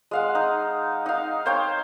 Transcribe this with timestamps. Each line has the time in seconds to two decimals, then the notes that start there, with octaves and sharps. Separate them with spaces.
0.11 G#3 F5 F#5
0.35 D#4
1.06 D#4 F5
1.46 C5 C#5 F5 G5